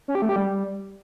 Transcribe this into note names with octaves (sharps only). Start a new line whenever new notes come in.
C#4
G4
A3
G4
G3